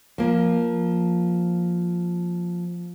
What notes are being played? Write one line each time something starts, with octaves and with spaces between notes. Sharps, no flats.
F3 A#3